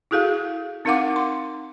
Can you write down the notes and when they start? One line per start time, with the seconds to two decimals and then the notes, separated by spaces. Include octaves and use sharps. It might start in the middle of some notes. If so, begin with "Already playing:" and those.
0.11 E4 F#4 G#4 A4 F5
0.85 C4 D#4 A#4 F5 F#5 D6
1.16 C6